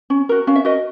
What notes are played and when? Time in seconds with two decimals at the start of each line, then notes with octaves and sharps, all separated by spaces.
0.10 C#4
0.29 F#4 A#4
0.47 C#4 F5
0.56 E5
0.65 F#4 A#4 D#5